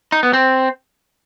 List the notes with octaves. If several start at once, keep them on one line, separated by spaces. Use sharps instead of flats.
D#4
B3
C4